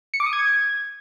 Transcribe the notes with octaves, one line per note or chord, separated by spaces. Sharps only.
C#7
D6
D#6
G#6